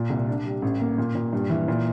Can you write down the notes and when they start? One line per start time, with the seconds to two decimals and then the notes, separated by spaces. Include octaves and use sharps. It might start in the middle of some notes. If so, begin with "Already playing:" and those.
Already playing: A#2
0.10 C2
0.28 D4
0.45 G3
0.62 A1
0.80 A#3
0.98 A#2
1.15 A#2
1.33 G2
1.50 E3
1.68 A#2